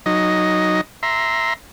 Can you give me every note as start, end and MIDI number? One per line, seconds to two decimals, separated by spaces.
0.06 0.81 54
0.06 0.81 63
0.06 0.81 75
1.03 1.53 76
1.03 1.53 82
1.03 1.53 84